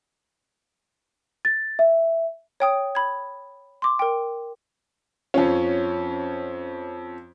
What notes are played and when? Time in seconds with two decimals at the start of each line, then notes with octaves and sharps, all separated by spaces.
1.45 A6
1.79 E5
2.60 C#5 G5 D#6
2.95 B5 G#6
3.82 C6 D6
3.99 A#4 G5
5.34 F2 C#4 F4